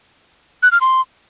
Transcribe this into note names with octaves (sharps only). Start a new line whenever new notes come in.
F#6
F6
C6